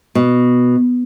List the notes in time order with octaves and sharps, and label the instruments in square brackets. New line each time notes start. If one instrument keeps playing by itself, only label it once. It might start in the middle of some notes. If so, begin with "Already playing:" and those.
[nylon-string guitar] B2